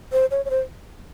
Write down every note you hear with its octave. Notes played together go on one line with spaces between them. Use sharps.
C5
C#5
C#5
C5